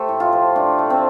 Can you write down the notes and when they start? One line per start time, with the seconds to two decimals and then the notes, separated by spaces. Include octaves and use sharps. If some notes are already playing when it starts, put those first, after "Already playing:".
Already playing: A3 G4 A4 C5
0.09 A2
0.20 F4
0.33 F3
0.56 A3 D4
0.79 A3
0.90 C4